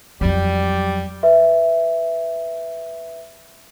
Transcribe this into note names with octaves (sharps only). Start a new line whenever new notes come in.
F2 F#3 G3
B4 E5